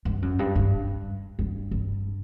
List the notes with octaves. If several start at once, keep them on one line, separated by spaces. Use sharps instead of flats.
G2
F#2
G2
G2
G2
G2